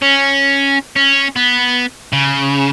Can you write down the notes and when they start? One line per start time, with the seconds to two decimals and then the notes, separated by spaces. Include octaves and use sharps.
0.02 C#4
0.96 C#4
1.36 B3
2.13 C#3